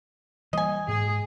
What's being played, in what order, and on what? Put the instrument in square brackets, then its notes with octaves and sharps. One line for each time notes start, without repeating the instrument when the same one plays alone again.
[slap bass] E3 G3 A#3 [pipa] D#5 G#5
[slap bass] G#2 [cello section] G#4